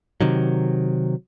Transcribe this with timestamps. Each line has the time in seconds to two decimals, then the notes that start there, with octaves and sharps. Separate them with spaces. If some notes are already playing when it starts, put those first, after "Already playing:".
0.21 C3 D#3 F#3